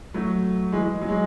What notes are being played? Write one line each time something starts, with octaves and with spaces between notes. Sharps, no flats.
F#3 A3
E3 G#3
F#3
G#3